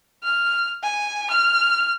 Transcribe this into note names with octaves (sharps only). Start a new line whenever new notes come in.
F6
G#5
F6